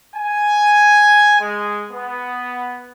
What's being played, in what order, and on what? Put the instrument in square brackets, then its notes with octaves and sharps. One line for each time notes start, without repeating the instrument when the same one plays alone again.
[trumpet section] G#5
G#3
B3